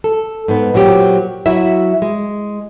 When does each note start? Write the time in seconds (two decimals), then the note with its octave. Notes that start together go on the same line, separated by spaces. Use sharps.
0.04 A4
0.48 G#2 B3
0.74 A#2 F#3 C4 G4
1.46 F#3 E4 F#4 E5
2.02 G#3